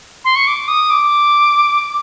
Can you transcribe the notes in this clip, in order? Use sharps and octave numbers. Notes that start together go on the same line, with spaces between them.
C6
C#6
D6
D#6
D6